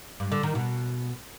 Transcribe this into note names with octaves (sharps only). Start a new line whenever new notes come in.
G2
D3
D#3
B2